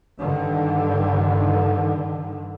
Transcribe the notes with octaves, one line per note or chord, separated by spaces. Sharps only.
G2 D3 D#3